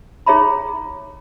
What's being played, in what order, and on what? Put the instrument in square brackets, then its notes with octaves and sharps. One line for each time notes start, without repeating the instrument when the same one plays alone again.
[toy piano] D#4 G#4 C#5 E5 A#5 B5